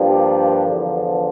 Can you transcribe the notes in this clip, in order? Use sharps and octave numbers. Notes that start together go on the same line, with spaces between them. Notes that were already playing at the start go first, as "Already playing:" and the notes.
Already playing: G2 F3 A#3 D4 G4
E2 D3 F3